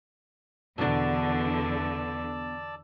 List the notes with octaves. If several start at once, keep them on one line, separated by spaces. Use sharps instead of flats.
E2 B2 D3 D4 D5 A5 E6